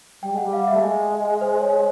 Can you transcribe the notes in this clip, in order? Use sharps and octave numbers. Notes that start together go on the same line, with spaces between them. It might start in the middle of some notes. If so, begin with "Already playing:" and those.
G3 G5
G#3 F#5
G3
F5
E5
A3
G#3 D#5
D#5
C5
C#5